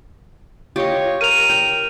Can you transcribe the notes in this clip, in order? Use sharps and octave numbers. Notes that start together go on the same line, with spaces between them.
F4 G4 C#5 D#5
A#4 D#7 F7
G5